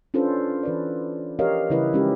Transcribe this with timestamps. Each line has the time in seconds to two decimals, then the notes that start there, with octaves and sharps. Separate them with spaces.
0.14 C#4 D4 F4 A4 B4 C5
0.63 E3 B4 D5
1.39 F3 G4 A#4 C#5 D#5 F5
1.70 C#3 E3 G3 E4 B4 D#5
1.93 F3 G#3 C#4 D#4 G4